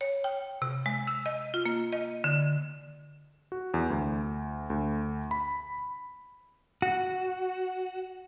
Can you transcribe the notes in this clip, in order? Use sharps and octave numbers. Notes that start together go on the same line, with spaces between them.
C#5
G5
C3
G#3
E6
D#5
F4
A#3
D#5
D3
F#4
E2
D2
D2
B5
F#4